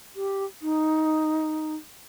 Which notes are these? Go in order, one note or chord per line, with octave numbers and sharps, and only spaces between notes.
G4
D#4